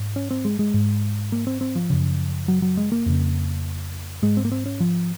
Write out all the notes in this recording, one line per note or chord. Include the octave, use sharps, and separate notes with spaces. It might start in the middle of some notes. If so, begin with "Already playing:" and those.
Already playing: G#2
C#4
C4
G#3
G#3
G#2
A#3
C4
C4
F3
F#2 C#3
F#3
F#3
G#3
A#3
F2 C#3
G#2 G#3
C4
A#3
C4
C#4
F3